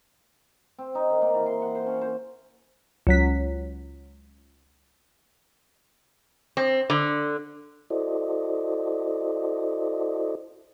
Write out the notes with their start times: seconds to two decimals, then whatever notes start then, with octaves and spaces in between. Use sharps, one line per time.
0.78 C4
0.95 D#4
1.10 D#3
1.22 A#3
1.34 E3
1.46 C6
1.62 F#5
1.75 C5
1.86 C#4
2.01 C5
3.07 C#2 F#3 B6
6.57 C4
6.90 D3
7.90 E4 F#4 A4 C5 D5 D#5